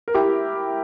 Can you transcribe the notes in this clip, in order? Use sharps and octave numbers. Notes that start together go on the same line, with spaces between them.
A#4
E4 G4